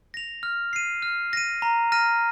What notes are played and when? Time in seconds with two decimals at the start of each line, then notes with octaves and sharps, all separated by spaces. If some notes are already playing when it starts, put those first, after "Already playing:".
0.14 A#6 F7
0.43 F6
0.73 C7 D#7
1.02 F6
1.33 A#6 D#7
1.62 A#5
1.92 F6 A#6 D#7